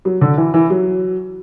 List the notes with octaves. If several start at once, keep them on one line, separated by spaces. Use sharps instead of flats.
F#3
D3
E3
E3
F#3